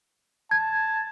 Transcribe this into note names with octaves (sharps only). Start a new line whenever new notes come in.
A5 G#6